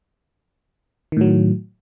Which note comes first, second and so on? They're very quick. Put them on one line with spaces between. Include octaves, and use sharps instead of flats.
D#3 A2 F#3